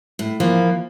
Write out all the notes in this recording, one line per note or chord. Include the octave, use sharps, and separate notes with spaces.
A2
E3 F3 A#3